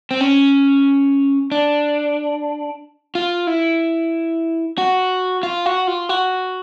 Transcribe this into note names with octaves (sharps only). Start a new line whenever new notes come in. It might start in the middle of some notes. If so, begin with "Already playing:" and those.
C4
C#4
D4
F4
E4
F#4
F4
F#4
F4
F#4